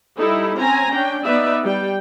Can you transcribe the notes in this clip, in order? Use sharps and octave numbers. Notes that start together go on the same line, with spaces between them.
G3 D#4 E4 A4
C4 C#4 G#5 A#5
C#4 D4 G5
B3 D#4 B4 D5 E5
G3 G5